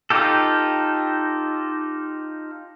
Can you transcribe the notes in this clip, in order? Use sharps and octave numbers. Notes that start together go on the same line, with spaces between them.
D#4 F4 G4 A4